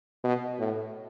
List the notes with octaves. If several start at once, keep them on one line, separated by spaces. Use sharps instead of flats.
B2
A2